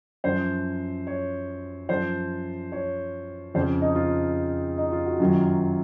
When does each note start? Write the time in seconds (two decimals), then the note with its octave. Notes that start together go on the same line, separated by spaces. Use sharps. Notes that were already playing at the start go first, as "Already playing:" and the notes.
0.24 F#2 F3 C5
1.07 C#5
1.89 F#2 F3 C5
2.72 C#5
3.54 F2 C#3 F3 C5
3.82 D#4
3.95 F4
4.78 D#4
4.92 F4
5.06 F#4
5.19 F#2 D#3 F#3 F4